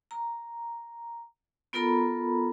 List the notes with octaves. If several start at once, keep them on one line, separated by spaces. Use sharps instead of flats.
A#5
B3 F4 A4 A#4 A#5 B5